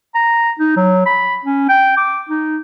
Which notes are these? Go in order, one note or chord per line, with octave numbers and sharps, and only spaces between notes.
A#5
D#4
F#3
B5
C#4
G5
D6
D#4